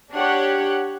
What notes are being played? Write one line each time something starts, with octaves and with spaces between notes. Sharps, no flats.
D4 G4 C#5 F#5